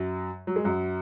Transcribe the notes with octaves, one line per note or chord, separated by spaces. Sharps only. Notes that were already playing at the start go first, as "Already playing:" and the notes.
Already playing: F#2 F#3
F#3
G#3
F#2 F#3